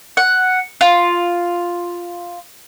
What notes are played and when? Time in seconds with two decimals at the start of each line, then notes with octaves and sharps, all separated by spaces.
0.17 F#5
0.81 F4